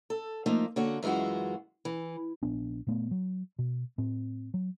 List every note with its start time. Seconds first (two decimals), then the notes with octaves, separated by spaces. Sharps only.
0.10 A4
0.46 F3 A3 A#3 D#4
0.76 D3 A#3 F#4 C#5
1.03 F#2 E3 G#3 F4 F#4
1.85 E3
2.43 A#1 B3 D4
2.87 A#2 A3 B3
3.11 F#3
3.59 B2
3.98 A2 C4
4.54 F#3